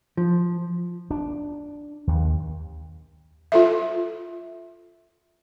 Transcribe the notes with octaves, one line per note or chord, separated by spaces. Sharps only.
F3
D4
D#2
F4 A4 E5